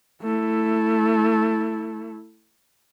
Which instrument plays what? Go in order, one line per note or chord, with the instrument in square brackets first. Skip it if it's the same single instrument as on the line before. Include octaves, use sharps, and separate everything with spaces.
[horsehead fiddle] A3 E4